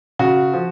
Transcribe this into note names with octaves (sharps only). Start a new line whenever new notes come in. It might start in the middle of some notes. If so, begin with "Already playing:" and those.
C#3 F#4
F3